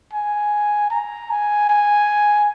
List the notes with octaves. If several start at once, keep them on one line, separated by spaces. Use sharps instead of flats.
G#5
A#5
G#5
G#5